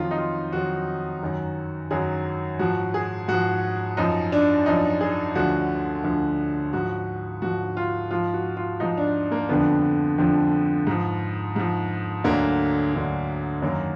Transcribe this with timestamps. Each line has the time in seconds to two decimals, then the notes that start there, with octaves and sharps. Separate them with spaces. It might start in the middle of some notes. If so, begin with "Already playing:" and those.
Already playing: F2 D#3 F#3 F4
0.11 D#4
0.18 F4
0.52 F2 D#3 F#3 F#4
1.22 F#2 D#3 F#3
1.91 F#2 D#3 F#3 G#4
2.59 G#2 F3 F#4
2.94 G#4
3.28 G#2 F3 F#4
3.97 F#2 F3 D#4
4.32 D4
4.66 F#2 F3 D#4
5.01 G#4
5.35 D2 D3 F3 F#4
6.04 D2 D3 F3
6.73 G#2 F3 F#4
7.42 G#2 F3 F#4
7.77 F4
8.11 G#2 F3 F4
8.34 F#4
8.57 F4
8.80 G#2 F3 D#4
8.97 D4
9.32 A#3
9.49 F2 D3 F3 B3
10.18 F2 D3 F3
10.87 G#2 F3
11.56 G#2 F3
12.24 D2 D3 F#3 A#3
12.93 D2 D3 F#3
13.62 F#2 D#3 F#3 A#3